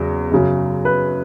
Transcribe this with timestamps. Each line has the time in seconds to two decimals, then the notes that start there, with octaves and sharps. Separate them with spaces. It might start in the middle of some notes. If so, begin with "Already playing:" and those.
Already playing: E2 C#3 F#3
0.31 F#2 C#3 F#3
0.85 B4